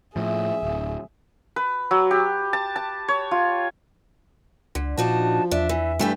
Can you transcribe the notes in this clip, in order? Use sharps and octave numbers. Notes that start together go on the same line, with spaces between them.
A2 F3 G#4 E5
D1
B4
F#3
G4
A5
A5
C#5
F4
C#2 D3
A#2 F3 D4 D#4 F#4 A5
E2 D4 E5
E3
G2 E3 A3 G4